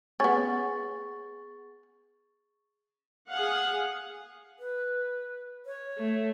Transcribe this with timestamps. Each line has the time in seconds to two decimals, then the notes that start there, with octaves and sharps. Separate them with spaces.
0.20 B3 C#4 G#4 C#6 A6
3.30 G#4 F5 F#5
4.59 B4
5.66 C#5
5.98 A3